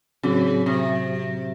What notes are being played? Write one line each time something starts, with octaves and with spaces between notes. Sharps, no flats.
A2 C#3 F#3 C4 F#4
C3